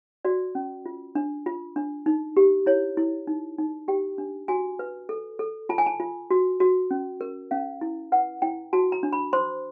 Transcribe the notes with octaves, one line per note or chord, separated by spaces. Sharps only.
F#4 D5
C#4
F4
D4
F4
D4
D#4
G4
E4 C#5
E4
D#4
D#4
G4 G5
D4
F#4 G#5
B4
A4
A4
F4 A5
G#5
A5
F4
F#4
F#4
C#4
A#4
C#4 F5
E4
B4 F#5
E4 G5
F#4 A5
A#5
D4
B5
C5 C6